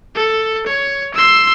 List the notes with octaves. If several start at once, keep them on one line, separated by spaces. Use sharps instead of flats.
A4
C#5
C6 E6